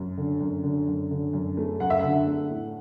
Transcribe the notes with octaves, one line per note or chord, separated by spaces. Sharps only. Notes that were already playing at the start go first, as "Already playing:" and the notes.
Already playing: F#2
D3
F#2
D3
F#2
D3
F#2
A3
F#2 F#5
E5
D3 F#5
A3
A2